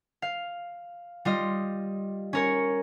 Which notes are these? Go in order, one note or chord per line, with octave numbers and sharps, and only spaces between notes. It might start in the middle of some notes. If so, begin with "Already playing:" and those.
F5
G3 F4 D#5
C#4 A#4 C#5